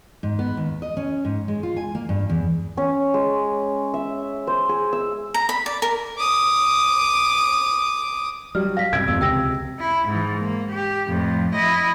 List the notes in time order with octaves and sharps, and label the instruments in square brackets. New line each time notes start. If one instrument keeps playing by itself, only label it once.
[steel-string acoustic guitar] G#2
B3
D#2
D#5
C#4
G#2
G#3
F4
G#5
A#3
G2
E2
[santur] C#4
G#3
E5
C5
G#4
E6
[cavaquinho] A#5
B5
D5
A#4
[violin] D6 D#6
[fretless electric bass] F#3 [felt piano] G3 D5 [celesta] F6
[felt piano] F5 [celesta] A#6 B6
[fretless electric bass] G2 C3 [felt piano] E6 G#6 [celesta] D7
[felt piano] F1 [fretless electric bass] D#2 G#2 F3 [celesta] E6
[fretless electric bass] C#2 [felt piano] C3 [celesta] G5 E6 A#6
[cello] E4
G#2 E3
A#3
G4
F2 A2
E4 D#5